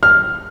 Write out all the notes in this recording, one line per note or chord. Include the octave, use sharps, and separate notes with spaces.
F6